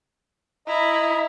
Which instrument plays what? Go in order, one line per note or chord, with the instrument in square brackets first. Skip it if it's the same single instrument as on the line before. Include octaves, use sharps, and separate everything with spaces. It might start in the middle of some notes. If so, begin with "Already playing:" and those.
[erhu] E4 [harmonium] D#5 A#5